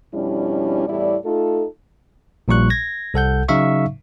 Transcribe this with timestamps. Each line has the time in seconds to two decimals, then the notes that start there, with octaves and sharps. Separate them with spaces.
0.14 F2 B2 G3 C#4 D4 E4
0.88 E2 A2 G3 E4 D5
1.25 A3 D#4 F4 A4
2.48 A#1 A#2 G3 C#6 F#6
2.70 G#6 A#6
3.14 C2 A4 F#5 G6
3.48 C#3 F#3 D#4 E5 F5 C#6